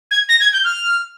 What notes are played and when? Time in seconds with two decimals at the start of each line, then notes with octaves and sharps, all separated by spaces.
0.11 G#6
0.29 A#6
0.40 G#6
0.53 G6
0.64 F6